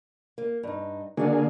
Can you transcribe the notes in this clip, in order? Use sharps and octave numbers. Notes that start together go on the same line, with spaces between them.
A#3
G2 D#4
D3 A#3 F#4 G#4 D5 F5